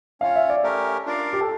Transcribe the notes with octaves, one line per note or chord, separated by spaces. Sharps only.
C#4 F4 C#5 F5
E5
D5
A3 C#4 G4 A#4
D4 F4 A#4 D5 F5
G4
A4